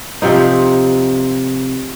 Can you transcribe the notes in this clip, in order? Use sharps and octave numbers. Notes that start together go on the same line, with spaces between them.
C3 F3 C4 D#4